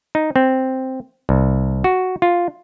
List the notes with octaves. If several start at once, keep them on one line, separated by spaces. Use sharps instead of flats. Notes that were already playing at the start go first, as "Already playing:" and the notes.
D#4
C4
C2
F#4
F4